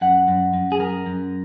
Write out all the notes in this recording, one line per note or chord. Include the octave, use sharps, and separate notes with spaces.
F#2 F#5
F#2
F#2
G#4
F#2 A#4
F#2